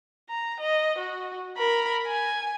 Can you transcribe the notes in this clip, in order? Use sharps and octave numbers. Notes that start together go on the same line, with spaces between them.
A#5
D#5
F#4
A#4 B5
G#5